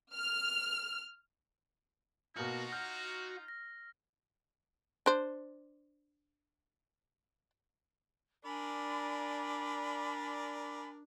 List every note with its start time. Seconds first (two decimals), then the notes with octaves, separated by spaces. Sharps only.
0.15 F6
2.36 B2 A#3 D#4 F4 F#4 A#5 F6
2.72 F6 G6
3.48 A#6
5.06 D4 C5
8.45 D4 A#4 D5 G#5 B5